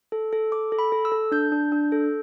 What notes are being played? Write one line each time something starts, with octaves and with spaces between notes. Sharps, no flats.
A4
A4
A4 D6
A4
B5
A4
E6
A4
D4 G6
D4
D4
A4